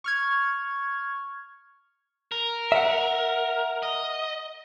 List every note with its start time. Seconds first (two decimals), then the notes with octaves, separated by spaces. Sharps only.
0.04 C#6 F6 G#6
2.32 A#4
2.72 E5 F#5
3.83 D#5